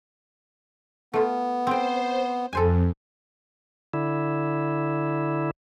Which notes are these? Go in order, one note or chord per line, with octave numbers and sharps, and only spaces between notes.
A3 B3 F4
C4 C5 G5
F2 A4 C5 G#5
D3 E4